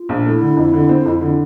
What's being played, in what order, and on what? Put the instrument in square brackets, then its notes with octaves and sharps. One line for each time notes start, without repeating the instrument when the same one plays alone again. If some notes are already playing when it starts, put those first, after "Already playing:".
Already playing: [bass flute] F4
[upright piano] A#1
[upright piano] A3 [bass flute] E4
[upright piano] D3
F2
D3
C4
F2
D3